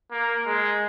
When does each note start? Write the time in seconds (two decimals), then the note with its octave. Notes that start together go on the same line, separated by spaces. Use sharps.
0.11 A#3
0.46 G#3